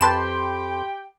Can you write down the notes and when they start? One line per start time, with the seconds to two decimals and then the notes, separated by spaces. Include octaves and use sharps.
0.01 F2 G4 B4 G5 A5 B5 C6 E7